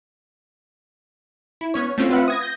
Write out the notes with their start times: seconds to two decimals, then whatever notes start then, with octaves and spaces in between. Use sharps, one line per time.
1.61 E4
1.74 B3 C#4 C#5
1.98 A3 C4 C#4 F4
2.09 C4 F4 B4 E5 F#5
2.28 D#6 G#6 A#6
2.41 G6 A#6